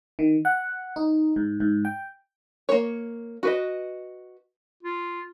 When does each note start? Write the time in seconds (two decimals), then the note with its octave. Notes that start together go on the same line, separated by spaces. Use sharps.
0.19 D#3
0.45 F#5
0.96 D#4
1.36 G#2
1.60 G#2
1.85 G5
2.69 A#3 C#5
3.43 F#4 B4 D#5
4.83 F4